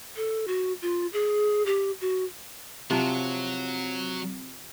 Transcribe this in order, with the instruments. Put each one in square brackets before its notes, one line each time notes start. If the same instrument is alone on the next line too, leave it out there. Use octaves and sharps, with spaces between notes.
[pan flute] A4
F#4
F4
G#4
G4
F#4
[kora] C3 F3 [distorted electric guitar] F#3 [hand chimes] C4